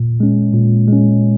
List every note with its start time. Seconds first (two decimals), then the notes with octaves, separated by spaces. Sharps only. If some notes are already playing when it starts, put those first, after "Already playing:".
Already playing: A#2
0.20 G#3 C#4
0.54 A#2
0.88 G#3 C#4